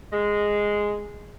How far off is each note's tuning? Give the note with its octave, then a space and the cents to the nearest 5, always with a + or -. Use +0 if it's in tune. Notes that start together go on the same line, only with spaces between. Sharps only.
G#3 -5